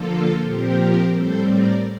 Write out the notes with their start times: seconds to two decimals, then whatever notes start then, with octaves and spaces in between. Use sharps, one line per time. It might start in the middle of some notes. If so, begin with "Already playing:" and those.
Already playing: D3 F3 A#3 F4 A4
0.39 A#2 F3 C4 G4 A#4
1.07 A2 G3 C4 A4 C5
1.42 A#4 D5